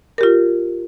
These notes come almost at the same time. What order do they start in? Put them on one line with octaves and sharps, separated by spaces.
A#4 G4 F4